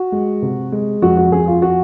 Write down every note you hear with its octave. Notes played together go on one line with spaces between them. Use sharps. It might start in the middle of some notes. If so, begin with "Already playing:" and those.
Already playing: F#4
G#3
C3
G#3
F2 F#4
F#4
F2 G#4
F4
F#4